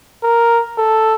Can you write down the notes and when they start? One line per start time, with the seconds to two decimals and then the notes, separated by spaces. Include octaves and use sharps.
0.24 A#4
0.78 A4